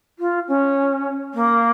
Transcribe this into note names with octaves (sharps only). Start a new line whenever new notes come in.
F4
C#4
A#3